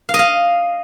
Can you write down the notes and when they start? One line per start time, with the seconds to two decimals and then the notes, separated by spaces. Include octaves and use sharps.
0.09 F5
0.14 D#5
0.19 F5